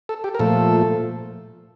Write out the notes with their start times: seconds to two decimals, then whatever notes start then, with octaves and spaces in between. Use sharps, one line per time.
0.09 A4
0.24 G4
0.35 A#4
0.39 A#2 F3 A3 A4